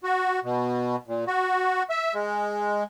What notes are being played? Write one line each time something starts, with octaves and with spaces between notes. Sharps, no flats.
F#4
B2
A#2
F#4
E5
G#3